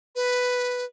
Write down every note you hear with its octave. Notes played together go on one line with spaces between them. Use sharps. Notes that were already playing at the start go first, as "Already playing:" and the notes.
B4